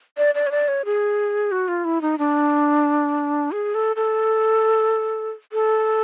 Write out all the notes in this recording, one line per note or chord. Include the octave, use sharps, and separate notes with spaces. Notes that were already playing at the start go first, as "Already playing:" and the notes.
D5
D5
C#5
D5
C#5
G#4
F#4
F4
E4
D#4
D4
G#4
A4
A4
A4